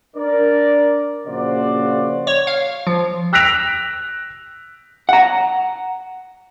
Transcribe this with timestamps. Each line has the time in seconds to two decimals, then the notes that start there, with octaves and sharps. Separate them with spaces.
0.16 D4 A#4 D5
1.26 A#1 C#3 A#3 F#4 C5 D5
2.27 C#5
2.47 F5
2.87 F3
3.33 E6 F#6 A#6 B6 D7 F7
5.09 F#5 A#5